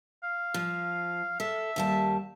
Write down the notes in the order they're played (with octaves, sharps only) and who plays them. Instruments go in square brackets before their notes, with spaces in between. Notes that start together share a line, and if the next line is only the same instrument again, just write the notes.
[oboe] F5
[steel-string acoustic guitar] F3
[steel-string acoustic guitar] A4 [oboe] E5
[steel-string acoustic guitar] D#2 G3 A5